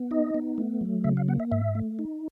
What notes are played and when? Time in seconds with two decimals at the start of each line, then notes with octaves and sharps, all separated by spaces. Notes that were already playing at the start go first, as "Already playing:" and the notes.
Already playing: B3
0.11 D#4 D#5
0.34 B3
0.58 A3
0.81 F#3
1.04 C#3 E5
1.17 F5
1.28 A#3 F#5
1.40 E5
1.51 G#2 E5
1.75 A3
1.99 D#4